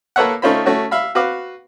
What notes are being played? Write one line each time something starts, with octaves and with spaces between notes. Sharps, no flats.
A#3 A4 B4 C#5 E5 F#5
A3 C#4 D#4 F4 C5 B5
A3 C#4 F#4
E5 F5 B5
F#4 B4 F5 D6